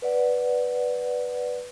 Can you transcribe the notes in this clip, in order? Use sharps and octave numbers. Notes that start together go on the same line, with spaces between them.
B4 D5 F#5